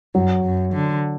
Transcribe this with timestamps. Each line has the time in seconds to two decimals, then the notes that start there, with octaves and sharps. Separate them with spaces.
0.15 F#2 F#3
0.44 F#2
0.73 D3